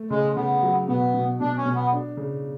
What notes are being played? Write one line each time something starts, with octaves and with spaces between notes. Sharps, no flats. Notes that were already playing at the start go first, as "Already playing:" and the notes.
Already playing: A3
C#3 G#3
C#3 B3
F#3
B2 B3
B2
B2 D4
C#4
B2
B3
D4
C#3